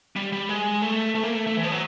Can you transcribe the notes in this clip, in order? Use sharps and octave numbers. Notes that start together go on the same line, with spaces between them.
G3
G3
G#3
A3
A3
A#3
A3
A3
E3
F3
F#3